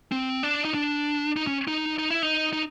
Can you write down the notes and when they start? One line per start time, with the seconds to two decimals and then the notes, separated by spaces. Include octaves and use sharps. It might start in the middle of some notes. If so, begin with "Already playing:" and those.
0.12 C4
0.43 D4
0.65 D#4
0.74 D4
1.37 D#4
1.47 C#4
1.68 D#4
1.99 D#4
2.11 E4
2.23 D#4
2.53 D#4